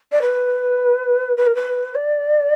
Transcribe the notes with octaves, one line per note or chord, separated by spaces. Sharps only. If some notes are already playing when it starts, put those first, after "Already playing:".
D5
B4
B4
A#4
B4
D5